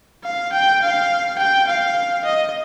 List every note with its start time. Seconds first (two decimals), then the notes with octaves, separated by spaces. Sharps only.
0.24 F5
0.53 G5
0.82 F5
1.38 G5
1.67 F5
2.24 D#5